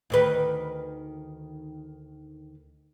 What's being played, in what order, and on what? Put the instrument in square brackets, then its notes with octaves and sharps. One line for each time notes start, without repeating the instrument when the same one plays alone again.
[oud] D2 D#3 B4